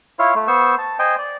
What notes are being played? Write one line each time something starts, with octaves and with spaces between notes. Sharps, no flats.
E4 F4 C#5 F5
A3
B3 C5 C#6 E6
A5
C5 D#5 G5 G#5
D5